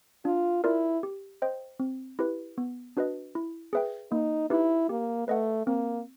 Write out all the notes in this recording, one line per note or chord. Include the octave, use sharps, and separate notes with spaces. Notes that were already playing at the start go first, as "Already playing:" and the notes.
D4 F4
E4 F4 A#4 D5
G4
C5 D#5 G5
C4
E4 G4 B4
B3
D4 F#4 B4 D#5
E4
G#4 B4 E5 G5
A#3 D#4
D#4 E4 G4 B4
A#3 G4
A3 B4 D#5 F#5
A#3 C4